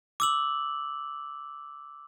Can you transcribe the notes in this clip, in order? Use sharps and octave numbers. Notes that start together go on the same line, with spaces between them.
D6 E6 F#7